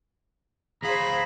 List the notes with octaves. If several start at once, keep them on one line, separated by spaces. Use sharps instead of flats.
D2 G#4 C5 F5 A#5 B5